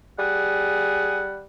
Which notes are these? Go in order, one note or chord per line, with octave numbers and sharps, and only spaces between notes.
G3 G#4 F#5